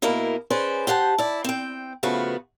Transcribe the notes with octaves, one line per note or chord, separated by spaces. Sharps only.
B2 A#3 E4 A#4 D#5
C#4 G#4 B4 C5 D5
G4 C5 F#5 A5
E4 D5
C4 G5
C#3 F3 A3 B3 F#4 B4